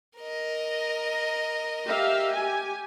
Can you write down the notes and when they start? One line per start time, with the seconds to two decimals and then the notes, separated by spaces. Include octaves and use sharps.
0.19 A#4 D#5
1.85 G4 E5 F5
2.33 G4 G#5